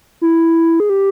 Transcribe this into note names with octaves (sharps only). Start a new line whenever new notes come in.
E4
G#4
G4